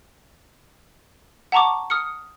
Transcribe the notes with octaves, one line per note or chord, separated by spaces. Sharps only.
F#5 A5 A#5 C#6 D6
D#6 F6 C#7